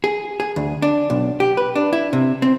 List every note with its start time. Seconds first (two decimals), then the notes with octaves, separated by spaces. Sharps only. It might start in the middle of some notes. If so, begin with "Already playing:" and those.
0.04 G#4
0.40 G#4
0.56 D2
0.82 D4
1.10 B1
1.40 G4
1.57 B4
1.75 D4
1.93 E4
2.13 C3
2.42 C4